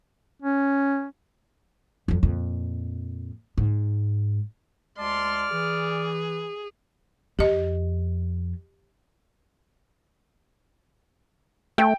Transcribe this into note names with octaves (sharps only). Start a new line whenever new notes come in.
C#4
F2 F#3
F2 A#2
G#2
D2 G#3 D5 A5 C6 F6
E3 G#4
F2 G4 D#5
A3 G5